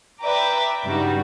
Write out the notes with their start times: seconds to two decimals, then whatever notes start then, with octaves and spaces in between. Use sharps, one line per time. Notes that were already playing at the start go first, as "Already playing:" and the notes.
0.23 B4 D5 E5 G5 A#5 D6
0.86 G2 C#3 G3 D#4 F#4